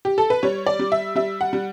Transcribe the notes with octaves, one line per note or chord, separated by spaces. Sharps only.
G4
A4
B4
G3 C#5
D5
G3
E5
G3 E5
F#5
G3